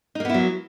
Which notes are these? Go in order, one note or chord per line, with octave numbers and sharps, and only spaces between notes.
F#3 A#3 B3 D#4 E4